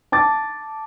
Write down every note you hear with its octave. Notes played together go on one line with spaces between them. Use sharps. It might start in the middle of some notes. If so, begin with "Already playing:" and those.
A5 D6 A6